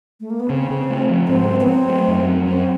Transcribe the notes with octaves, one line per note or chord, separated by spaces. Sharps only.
A3
A#3
B3
C#3 C4
C#3
A3
F3
G#2 C4
F#3
B3
F#3 C4
A3
F#2
F#3
F#2 C4